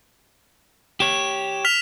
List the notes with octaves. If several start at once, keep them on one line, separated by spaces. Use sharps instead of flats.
G4 C#5 E7
F6 B6 F7